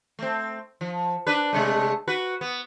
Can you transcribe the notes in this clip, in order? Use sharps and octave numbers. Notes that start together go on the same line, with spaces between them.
A3 C4
F3
D4 B4
C3 G#3 A3
F#4 B4
B3